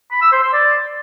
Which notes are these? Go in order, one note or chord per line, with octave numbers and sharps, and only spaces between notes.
B5
E6
C5
C6
D5